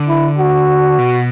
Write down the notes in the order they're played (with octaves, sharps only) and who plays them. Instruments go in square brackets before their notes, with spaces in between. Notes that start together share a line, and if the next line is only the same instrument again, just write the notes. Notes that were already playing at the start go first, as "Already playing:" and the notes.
Already playing: [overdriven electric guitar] D3
[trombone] E4
F#4
[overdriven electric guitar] B2